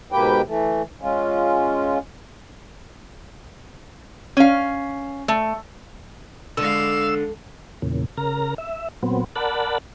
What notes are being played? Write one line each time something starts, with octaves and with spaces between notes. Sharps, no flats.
G#2 B2 A#3 G4 B4 G5
E3 A3
G#3 C#4 F4
C#4 F5
A3
D3 G#3 F5 E6
E2 A#2 C#3
C#3 A#4 A#5
E5
A#2 F#3 B3 C4
A#4 D5 F#5 A5 B5